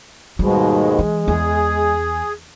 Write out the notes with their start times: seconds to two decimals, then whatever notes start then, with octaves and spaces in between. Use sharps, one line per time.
0.39 D#2 G#2 B2 G3 G#3
0.99 E3
1.28 E2 G#4